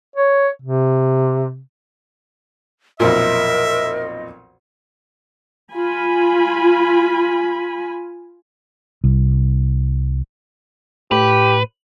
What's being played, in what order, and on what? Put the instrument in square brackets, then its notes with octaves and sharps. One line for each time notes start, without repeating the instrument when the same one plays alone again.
[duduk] C#5
C3
[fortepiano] B1 F2 A#2 [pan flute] A#4 [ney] D#5 [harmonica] E5
[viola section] F4 G#5 B5
[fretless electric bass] C2
[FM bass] A2 [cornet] G4 [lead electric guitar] B4